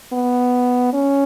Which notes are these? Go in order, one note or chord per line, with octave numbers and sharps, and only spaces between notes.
B3
C#4